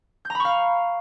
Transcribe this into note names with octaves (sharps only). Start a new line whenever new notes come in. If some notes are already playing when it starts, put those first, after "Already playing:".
F5 A#5 B5 C#6 G6